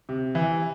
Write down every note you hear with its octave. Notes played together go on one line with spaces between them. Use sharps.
C3
E3